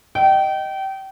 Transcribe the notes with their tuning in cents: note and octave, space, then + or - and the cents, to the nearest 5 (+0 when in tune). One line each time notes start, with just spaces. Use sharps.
D#5 +0 G5 -30